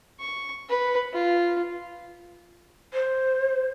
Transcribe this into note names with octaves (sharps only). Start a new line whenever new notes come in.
C#6
B4
F4
C5